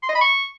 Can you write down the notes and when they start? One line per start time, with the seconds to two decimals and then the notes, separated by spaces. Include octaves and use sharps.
0.03 C6
0.09 D#5
0.15 B5
0.21 C#6